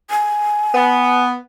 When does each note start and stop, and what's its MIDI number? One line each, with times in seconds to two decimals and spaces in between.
0.10 1.24 80
0.74 1.34 59